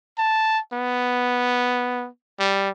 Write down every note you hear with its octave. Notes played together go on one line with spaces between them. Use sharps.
A5
B3
G3